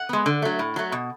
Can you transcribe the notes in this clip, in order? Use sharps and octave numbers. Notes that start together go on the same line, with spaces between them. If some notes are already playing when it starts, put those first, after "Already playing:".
Already playing: F#5
G#3 B3
D3
F#3 A3
A2
F#3 A3
B2